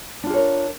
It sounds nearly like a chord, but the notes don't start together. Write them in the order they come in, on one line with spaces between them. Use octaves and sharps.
D4 F4 G#4 C#5 A#4